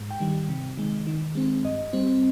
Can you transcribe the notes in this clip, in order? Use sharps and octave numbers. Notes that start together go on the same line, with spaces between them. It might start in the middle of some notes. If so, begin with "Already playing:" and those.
Already playing: G#2
G5
D#3 G3
C3
D#3 G#3
D#3
G#3 C4
G2 D#5
G3 C4